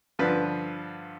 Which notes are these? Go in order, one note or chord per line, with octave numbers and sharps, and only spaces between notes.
G2 D3 F3 B4